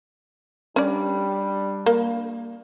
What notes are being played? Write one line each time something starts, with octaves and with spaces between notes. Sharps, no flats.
G3 C#4 D4 D5
A#3